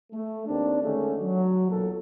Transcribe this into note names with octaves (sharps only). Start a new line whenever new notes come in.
A3
D#2 C4 D4
D3 D#3 G#3 A3 C#4
F#3
B1 E2 A#2 A4